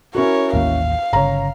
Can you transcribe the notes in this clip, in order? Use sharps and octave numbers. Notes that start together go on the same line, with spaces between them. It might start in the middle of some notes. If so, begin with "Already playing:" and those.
C#4 E4 F#4 A#4 C#5
A1 D#2 A#3 F5
G1 C#3 C#5 A#5